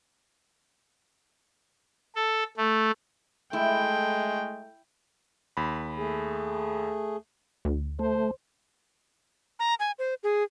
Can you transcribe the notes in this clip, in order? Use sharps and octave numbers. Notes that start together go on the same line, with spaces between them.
A4
A3
G#3 A3 E4 G5
D#2 B5
A3 G#4
D2
A3 C5
A#5
G#5
C5
G#4